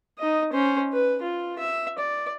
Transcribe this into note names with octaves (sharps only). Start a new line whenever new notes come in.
D#4 D#5
C#4 C5
B4
F4
E5
D5